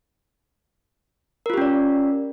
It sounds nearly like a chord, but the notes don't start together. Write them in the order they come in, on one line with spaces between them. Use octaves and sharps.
A#4 F4 G4 C#4 D5